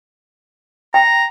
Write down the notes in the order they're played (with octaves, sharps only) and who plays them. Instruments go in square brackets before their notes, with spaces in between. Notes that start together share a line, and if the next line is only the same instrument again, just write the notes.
[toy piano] G5 [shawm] A#5